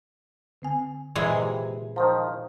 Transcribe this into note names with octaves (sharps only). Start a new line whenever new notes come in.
D3 C4 G#5
A#2 E3 G#3
C3
D#3 F3 C5 A#5